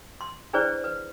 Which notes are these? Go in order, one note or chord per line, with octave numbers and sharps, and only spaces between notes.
C6
D4 E4 G#4 B4 C5 D5
B4